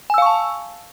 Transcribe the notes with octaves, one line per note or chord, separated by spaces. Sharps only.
F5 G#5 A5 C#6 E6